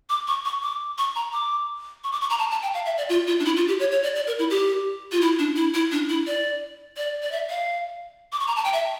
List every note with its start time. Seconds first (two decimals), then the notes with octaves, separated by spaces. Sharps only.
0.10 D6
0.28 C#6
0.45 C#6
0.63 D6
0.98 C#6
1.16 A#5
1.33 D6
2.04 C#6
2.12 D6
2.21 C#6
2.30 A#5
2.39 A5
2.51 A5
2.62 G5
2.74 F5
2.86 E5
2.98 D5
3.09 F4
3.27 F4
3.40 D4
3.45 E4
3.56 F4
3.68 G4
3.79 C#5
3.92 C#5
4.03 D5
4.15 D5
4.27 A#4
4.39 E4
4.50 G4
5.12 F4
5.21 E4
5.39 D4
5.56 E4
5.74 E4
5.91 D4
6.09 E4
6.27 D5
6.97 D5
7.22 D5
7.32 E5
7.50 F5
8.33 D6
8.40 C#6
8.47 A#5
8.56 A5
8.64 G5
8.73 E5